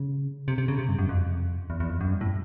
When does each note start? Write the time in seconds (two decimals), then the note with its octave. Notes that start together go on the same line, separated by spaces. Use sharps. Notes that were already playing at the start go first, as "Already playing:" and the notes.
Already playing: C#3
0.48 C3
0.58 C3
0.68 C#3
0.79 C3
0.89 G2
0.99 F#2
1.09 F2
1.70 E2
1.80 E2
1.90 F2
2.01 F#2
2.11 G2
2.21 A2